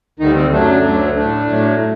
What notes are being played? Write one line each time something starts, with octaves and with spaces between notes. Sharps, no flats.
D2 D3 D#3 G3 D#4
C4
F#2 F#3 A3 D4
D2 D3 F#3 A3
A2 A3 D4
A2 F#3 A3